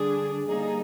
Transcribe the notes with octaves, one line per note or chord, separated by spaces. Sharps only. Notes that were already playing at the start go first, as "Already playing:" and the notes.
Already playing: D3 G3 D4 G#4
D3 G3 A#3 D#4 G#4